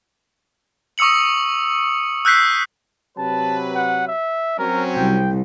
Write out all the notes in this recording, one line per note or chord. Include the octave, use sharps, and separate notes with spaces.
C#6 D#6 E6 C#7 F#7
E6 F#6 G6 B6 C7
C3 F#3 B4 A5
F#5
E5
F#3 C4 C#4 A#4
C2 G5